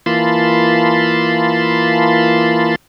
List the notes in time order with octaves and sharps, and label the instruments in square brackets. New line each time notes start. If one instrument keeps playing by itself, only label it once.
[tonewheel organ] E3 A#3 F4 A5 B5 C6